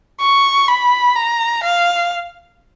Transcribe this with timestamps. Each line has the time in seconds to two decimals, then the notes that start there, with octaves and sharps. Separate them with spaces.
0.20 C#6
0.68 B5
1.15 A#5
1.63 F5